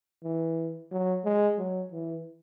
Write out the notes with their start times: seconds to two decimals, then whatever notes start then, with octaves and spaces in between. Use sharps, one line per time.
0.23 E3
0.91 F#3
1.25 G#3
1.58 F#3
1.92 E3